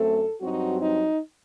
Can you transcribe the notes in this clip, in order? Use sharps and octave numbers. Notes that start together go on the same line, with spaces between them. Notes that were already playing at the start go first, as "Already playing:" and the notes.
Already playing: F#2 A3 C4 A4
G2 F#3 C4 D#4 F#4
D#4